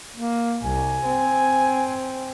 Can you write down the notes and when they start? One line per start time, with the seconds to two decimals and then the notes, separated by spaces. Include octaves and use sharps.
0.16 A#3
0.63 C2 G#5
1.06 C4